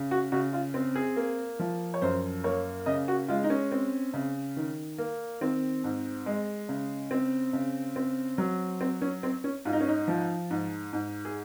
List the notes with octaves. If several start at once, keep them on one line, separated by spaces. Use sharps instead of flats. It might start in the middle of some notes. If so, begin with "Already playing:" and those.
Already playing: C#3
F#4
C#3 F#4
F4
C4
G#4
A#3
F3
C#5
F#2 C5
A#3 C#5
C#3 D#5
F#4
G#3 F4
D#4
C#4
C4
C#3
D#3
A#3
D#3 C4
G#2
G#3
C#3
C4
C#3
C4
F#3
C4
C#4
C4
C#4
G#2 F4
D#4
C#4
D#4
F3
G#2
G#2
G#4